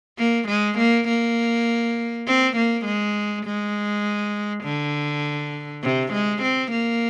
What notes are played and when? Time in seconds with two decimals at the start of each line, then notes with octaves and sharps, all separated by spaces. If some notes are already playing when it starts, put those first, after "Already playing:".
0.19 A#3
0.48 G#3
0.78 A#3
1.08 A#3
2.27 C4
2.56 A#3
2.85 G#3
3.45 G#3
4.64 D3
5.83 C3
6.13 G#3
6.42 C4
6.71 A#3